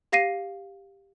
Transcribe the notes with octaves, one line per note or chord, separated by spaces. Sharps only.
G4 F5 A#6 C7 D#7